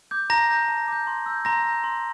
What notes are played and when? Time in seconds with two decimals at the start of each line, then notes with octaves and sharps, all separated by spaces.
0.11 D6 G6
0.30 A5 A#5 A#6
0.50 D6 G6
0.68 A5
0.88 D6 G6
1.07 C6
1.26 E6 G6
1.45 A#5 C6 A#6
1.65 E6 G6
1.84 C6